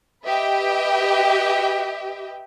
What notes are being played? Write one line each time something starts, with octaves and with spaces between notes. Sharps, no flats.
G4 B4 D#5 E5 G5